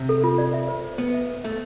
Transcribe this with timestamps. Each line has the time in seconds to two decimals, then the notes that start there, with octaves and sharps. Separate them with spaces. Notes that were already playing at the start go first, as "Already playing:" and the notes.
Already playing: C3
0.09 A4
0.24 F4
0.38 D5
0.54 E5
0.68 C5
0.84 C5
0.98 B3 C5
1.14 E5
1.29 C5
1.44 A3 E5